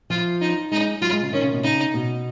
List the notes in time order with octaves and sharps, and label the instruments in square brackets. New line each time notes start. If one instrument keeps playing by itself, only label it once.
[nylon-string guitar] F3 [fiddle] F4
[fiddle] D#4
[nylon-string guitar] G#3 [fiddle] D#4
[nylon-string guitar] F#3 [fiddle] F4
[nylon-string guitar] G#3
C#3
[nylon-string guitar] D#3 [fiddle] C#4
[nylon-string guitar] C#3
B2
[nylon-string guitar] C#3 [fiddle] D#4
[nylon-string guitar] B2